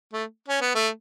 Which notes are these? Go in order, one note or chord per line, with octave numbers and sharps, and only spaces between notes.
A3
C#4
B3
A3